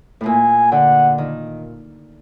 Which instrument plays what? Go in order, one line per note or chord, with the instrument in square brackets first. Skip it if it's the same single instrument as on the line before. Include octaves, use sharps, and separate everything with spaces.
[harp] A2
[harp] A#2 [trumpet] G#5
[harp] D3 [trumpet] F#5
[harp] D#3